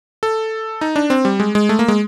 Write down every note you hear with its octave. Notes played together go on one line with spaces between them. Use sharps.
A4
D#4
D4
C4
G3
G#3
G#3
A3
A#3
G#3